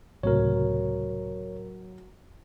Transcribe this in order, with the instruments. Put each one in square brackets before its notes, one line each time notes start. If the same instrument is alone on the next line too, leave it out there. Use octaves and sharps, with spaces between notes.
[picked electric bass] C#2 A2 C3 [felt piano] F#3 [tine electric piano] A#4 C#5